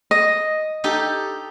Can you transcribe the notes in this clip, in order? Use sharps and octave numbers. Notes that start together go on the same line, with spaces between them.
D#5
D#4 G4 A4